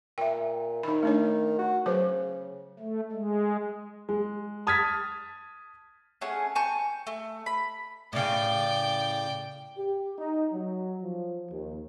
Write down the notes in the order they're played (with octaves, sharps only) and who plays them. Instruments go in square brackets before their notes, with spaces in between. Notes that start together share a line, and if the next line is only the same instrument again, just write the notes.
[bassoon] A#2 [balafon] E5 G5
[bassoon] D#3 [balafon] D#4 B5
[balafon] A3 D4 C#5
[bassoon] F#4
[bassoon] C#3 [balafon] F#3 B4 C5
[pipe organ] A3
G#3
[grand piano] G#3
A5 D#6 F6 G#6 A6 B6
[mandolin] A3 C#4 G#4 F#5
G#5 A5 C#6 G6
A3
B5
[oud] A2 C#3 [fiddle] D5 G5
[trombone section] G4
D#4
F#3
F3
D#2